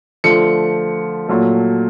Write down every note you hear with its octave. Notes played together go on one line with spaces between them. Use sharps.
D3 F3 A3 C#7
A#2 F#3 A3